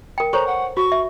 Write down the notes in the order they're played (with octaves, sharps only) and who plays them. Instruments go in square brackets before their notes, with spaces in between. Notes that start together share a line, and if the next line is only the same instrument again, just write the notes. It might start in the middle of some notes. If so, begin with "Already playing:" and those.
[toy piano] A#4 G5
[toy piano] A4 C5 C#5 [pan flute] A#5 [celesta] C#6
[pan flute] F#5
[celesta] F#4 [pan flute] C#6
[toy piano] E5